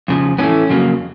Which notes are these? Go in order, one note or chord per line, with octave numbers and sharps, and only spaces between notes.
F2 C#3 F3
A2 E3 A3 B3 C#4
F2 C#3 F#3 A#3